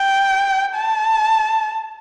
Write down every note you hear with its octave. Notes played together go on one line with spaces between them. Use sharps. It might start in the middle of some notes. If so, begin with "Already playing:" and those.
Already playing: G5
A5